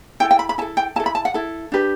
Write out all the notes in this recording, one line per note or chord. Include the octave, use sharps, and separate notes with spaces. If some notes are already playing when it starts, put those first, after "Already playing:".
E4 A4 G5
G5
B5
B5
E4 A4 A5
G5
E4 A4 A5
B5
A5
F#5
E4 A4
D4 G4 B4